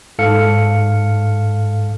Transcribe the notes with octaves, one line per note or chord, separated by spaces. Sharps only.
G#2 A4 F5 C#7